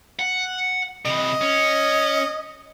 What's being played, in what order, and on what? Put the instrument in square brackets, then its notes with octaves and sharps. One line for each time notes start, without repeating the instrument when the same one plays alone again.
[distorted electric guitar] F#5
[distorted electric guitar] C3 E3 [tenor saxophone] D#5
[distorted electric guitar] C#4